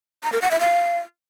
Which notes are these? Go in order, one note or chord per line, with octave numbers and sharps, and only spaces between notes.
A#5
A#4
F#5
E5
F5